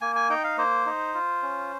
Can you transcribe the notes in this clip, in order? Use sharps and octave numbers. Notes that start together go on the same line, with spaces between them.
A#3 G#5
G#5
D#4 G5
F5
A#3 C5
D#4
F4
C#4